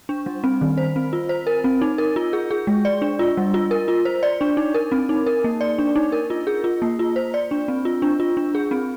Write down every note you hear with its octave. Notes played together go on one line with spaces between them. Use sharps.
D4
G3
C4
D#3
C5
C4
F4
C5
A#4
C4
D#4
A#4
F4
G#4
G#4
G#3
D5
D4
F4
G3
F4
A#4
F4
C5
D5
D4
D#4
A#4
C4
D#4
A#4
A#3
D5
D4
D#4
A#4
F4
G#4
F4
A#3
F4
C5
D5
D4
C4
F4
D4
F4
D4
G#4
C4